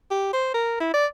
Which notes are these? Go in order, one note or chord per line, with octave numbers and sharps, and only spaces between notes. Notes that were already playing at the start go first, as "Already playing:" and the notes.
G4
C5
A#4
E4
D5